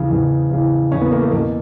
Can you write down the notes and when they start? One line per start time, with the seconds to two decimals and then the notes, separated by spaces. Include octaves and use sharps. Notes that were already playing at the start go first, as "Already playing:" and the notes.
Already playing: E2 C#3 E3
0.10 E2 C#3 E3
0.51 E2 C#3 E3
0.92 E2 C#3 E3 C#4
1.02 B3
1.12 A#3
1.22 A3
1.32 E2 B2 A#3